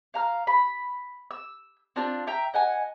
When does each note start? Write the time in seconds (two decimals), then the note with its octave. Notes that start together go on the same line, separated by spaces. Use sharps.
0.14 F5 A#5 F6
0.47 B5
1.31 E6
1.96 C4 D4 F4 F5
2.27 E5 G5 A#5
2.54 D#5 F#5 G#5